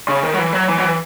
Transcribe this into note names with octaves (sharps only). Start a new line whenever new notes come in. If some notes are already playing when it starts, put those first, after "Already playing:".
C#3
D#3
F#3
E3
F#3
E3
F#3
E3